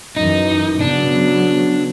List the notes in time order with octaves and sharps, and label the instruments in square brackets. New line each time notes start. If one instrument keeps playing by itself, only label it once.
[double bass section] F#2 E3 [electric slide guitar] D#4
[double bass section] C#3 F#3 B3 [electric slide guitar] D4